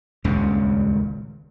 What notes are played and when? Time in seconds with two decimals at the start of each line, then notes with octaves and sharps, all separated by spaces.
0.24 D#1 C#2 G2 C#3